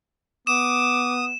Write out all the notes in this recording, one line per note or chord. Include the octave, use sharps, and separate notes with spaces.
B3 D6 D#6 E7